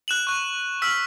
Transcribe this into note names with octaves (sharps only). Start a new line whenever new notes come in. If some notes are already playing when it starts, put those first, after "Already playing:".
F#6 E7 F#7
C#6 F#6
E6 F6 B6 F#7